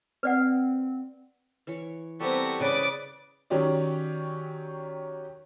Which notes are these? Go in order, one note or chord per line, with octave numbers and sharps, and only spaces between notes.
C4 B4 D5 F#5
E3 C#5
G3 B3 C4 G4 A4 A#5 C#6
C#3 B4 D5 D6 D#6
D#3 F#3 C#4 G4 C#5 D5